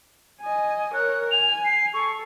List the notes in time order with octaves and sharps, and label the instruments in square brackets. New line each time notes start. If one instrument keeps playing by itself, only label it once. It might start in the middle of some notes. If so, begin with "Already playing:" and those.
[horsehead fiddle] D#5 G#5
[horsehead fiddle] A#4 C#5 [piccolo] F#6
[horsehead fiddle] G#5 [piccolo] F7
[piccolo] C7
[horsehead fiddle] A4 [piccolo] C#6